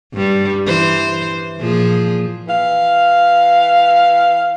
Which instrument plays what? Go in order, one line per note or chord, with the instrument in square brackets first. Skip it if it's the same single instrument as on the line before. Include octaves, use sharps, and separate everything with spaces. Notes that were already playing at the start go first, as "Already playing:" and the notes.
[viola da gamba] G2 G3
E3 C5
A#2 F3 G#4
[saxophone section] E3 F5